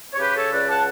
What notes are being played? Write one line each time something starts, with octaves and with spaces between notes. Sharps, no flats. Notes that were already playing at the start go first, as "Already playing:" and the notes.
C#5
C#3 G4 B4
A4 C#5
C#2 B4 D5
F#5 A5